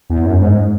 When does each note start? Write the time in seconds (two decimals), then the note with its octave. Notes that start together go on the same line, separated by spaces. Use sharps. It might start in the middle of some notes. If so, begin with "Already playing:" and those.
0.10 E2
0.25 F#2
0.41 G#2